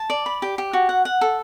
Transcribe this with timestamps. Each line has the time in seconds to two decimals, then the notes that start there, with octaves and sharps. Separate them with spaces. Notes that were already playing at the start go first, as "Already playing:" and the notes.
Already playing: A5
0.10 D5
0.26 B5
0.42 G4
0.58 G4
0.73 F#4
0.89 F#5
1.05 F#5
1.21 A4